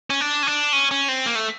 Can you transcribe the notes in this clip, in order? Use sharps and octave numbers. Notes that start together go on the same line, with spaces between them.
C#4
D4
C#4
D4
C#4
C#4
C4
A#3
A3